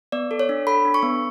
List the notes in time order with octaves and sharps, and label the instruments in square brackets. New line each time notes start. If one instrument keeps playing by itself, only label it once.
[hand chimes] B3 D5
A4
C#5
D4
A4 B5
D4
C#6
B3